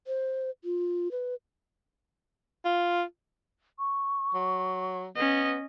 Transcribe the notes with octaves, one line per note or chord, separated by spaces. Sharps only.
C5
F4
B4
F4
C#6
F#3
B3 C#4 D#5